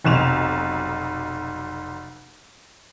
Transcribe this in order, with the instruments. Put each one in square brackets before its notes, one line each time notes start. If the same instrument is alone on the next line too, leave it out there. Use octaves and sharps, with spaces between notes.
[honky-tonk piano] F1 B1 E7 F7